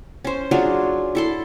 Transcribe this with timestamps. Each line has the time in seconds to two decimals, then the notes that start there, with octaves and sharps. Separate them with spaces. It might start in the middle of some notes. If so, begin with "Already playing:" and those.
0.25 C#4 C5
0.51 F#3 D4 F4 G#4
1.15 E4 A4 C6